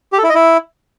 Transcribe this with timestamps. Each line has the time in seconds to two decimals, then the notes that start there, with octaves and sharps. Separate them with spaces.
0.13 G4
0.18 A4
0.24 E4
0.29 D#5
0.35 E4